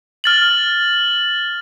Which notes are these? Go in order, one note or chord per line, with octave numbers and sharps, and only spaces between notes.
F6 A6 F#7